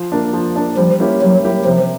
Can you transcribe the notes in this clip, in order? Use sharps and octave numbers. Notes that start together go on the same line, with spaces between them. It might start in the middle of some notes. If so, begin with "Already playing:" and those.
Already playing: F3
A#3 D4
F3
A#3 D4
F3 G3
A#3 C#4 E4 G4
F#3 G3
A#3 C#4 E4 G4
C3 F3